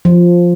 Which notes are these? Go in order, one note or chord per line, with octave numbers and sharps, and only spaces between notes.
F3